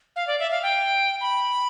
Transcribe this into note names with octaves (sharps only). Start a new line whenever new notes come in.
F5
D5
E5
F5
G5
B5